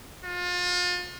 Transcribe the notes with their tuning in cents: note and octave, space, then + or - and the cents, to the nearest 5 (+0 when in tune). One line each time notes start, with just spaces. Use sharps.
F4 +35